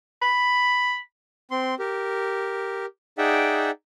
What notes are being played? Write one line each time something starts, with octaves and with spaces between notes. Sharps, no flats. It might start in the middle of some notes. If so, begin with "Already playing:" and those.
B5
C4 C6
G4 A#4
D#4 G#4 D5 E5 F#5 G5